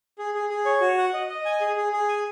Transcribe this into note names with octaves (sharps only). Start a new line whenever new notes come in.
G#4
G#4
G#4
C#5
F#4
F#5
D#5
D#5
G#5
G#4
G#4
G#4
G#5